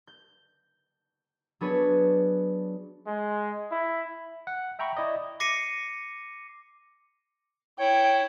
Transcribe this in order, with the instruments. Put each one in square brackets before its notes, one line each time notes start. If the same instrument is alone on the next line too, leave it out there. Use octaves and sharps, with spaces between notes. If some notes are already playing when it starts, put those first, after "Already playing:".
[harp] G6
F#3 B3 D4 G#4 B4 C#5
[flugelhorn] G#3
E4
[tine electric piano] F#5
E5 G5 A#5 B5 C#6
E4 D5 D#5
[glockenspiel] D6 A#6 C7 C#7 D#7
[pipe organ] E4 [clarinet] C#5 [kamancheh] G5